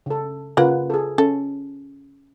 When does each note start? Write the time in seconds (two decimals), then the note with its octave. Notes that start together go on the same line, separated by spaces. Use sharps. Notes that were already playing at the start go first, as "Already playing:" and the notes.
0.06 C#3 A4
0.57 C#3 A#3 F4 B4 F#5
0.90 G#4 A4
1.18 C#4 A4